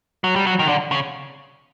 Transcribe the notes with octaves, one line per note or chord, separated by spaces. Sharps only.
F#3
G3
F#3
D#3
D3
C#3